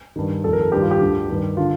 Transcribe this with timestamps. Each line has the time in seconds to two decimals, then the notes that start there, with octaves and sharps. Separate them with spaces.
0.16 G2 D#3
0.44 F2 D#3 A4
0.53 A#4
0.61 A4
0.72 G2 D#3 G4
0.82 F4
0.91 G4
1.01 D2 D3
1.30 G2 D#3
1.57 D3 F4